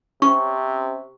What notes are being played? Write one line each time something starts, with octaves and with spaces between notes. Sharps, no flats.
C3 C#4 G4 C5 C#6